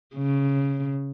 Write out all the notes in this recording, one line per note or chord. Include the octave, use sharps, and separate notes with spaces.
C#3